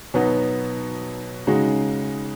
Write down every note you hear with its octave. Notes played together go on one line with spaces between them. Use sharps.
B2 F#3 B3 D#4
C#3 G#3 D#4 F#4